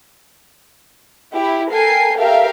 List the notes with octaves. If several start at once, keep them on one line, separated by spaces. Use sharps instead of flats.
E4 G4
A4 A#4 G5 G#5 C7
G4 A4 A#4 E5 F5 G5